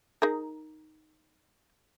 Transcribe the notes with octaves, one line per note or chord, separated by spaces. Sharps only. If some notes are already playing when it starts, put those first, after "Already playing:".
D#4 G#4 A#4